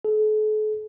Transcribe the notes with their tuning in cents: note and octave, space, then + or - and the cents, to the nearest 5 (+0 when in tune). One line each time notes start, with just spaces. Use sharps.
A4 -45